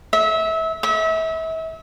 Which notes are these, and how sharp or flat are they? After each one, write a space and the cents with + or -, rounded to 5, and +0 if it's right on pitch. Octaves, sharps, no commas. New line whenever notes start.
E5 -25
E5 -35